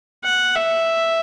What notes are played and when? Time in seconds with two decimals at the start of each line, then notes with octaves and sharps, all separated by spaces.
0.24 F#5
0.56 E5